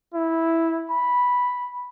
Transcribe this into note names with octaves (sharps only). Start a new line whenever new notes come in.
E4
B5